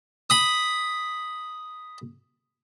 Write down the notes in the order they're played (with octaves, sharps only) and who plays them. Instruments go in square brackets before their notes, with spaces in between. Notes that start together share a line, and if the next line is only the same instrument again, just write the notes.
[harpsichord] B5 D#6